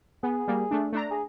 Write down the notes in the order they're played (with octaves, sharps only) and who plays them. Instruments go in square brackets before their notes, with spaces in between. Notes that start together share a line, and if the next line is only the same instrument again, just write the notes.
[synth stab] B3 [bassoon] G#4
[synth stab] G3 A#3
A3 D4
A3 D4 A#5
[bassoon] G#4